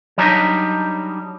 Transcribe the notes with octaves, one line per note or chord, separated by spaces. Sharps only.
F#3 G3 D4 D#4